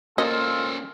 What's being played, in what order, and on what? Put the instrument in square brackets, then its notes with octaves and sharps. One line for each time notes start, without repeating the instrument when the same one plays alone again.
[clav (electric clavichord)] A#3 [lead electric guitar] C#4 C5 [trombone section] F4 A4 [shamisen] D#5